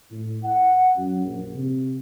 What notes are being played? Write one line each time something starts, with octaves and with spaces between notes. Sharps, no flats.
A2
F#5
F#2
A#1
C3